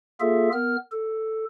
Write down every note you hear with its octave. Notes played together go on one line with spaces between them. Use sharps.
A#3 F4 G#4 A4 E5
B3 A#4 F6
A4